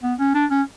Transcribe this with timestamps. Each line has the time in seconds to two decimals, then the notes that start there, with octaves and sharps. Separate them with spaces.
0.03 B3
0.19 C#4
0.35 D4
0.51 C#4